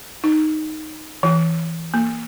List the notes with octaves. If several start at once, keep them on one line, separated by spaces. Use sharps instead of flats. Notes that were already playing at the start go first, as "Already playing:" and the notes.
D#4
E3
A#3